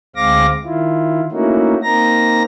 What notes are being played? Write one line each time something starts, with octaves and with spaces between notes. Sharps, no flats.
D2 G#3 C4 F5 D6 A#6
D#3 E4 F4
A3 A#3 C#4 D#4 E4 F#4
A#3 C4 D#4 A#5 A#6